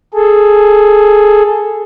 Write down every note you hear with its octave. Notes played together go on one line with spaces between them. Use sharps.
G#4 A4